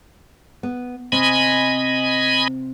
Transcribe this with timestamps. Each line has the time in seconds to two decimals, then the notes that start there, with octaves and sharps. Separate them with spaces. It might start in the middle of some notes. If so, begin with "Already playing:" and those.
0.63 B3
1.12 C3 C4 D#5 G#5 B5